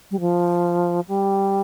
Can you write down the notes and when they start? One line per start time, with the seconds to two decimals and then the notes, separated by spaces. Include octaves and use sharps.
0.11 G3
0.20 F3
1.08 G3